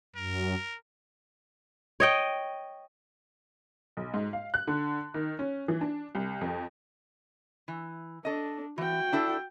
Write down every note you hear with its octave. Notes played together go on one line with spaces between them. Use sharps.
F#2 A#4
C#5 D#5 G5
B1
G#2
F5
F#6
D3
D#3
C#4
E3
D4
C2
F2
E3
D4 A4 D#5
E3 F#4 G5
D4 E4 A4